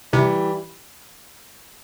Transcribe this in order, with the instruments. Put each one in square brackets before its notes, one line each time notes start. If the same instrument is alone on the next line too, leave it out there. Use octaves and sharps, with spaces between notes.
[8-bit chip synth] C3 [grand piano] E3 G3